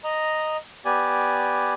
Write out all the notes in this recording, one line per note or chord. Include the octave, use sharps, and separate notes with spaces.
D#5 A#5
B3 G4 D5 G#5